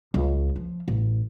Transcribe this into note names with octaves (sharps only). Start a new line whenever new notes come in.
C#2
F3
A1